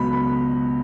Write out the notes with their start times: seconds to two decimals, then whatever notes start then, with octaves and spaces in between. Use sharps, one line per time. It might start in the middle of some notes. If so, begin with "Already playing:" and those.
Already playing: C#2 B2 F#3 B3 B5
0.13 B5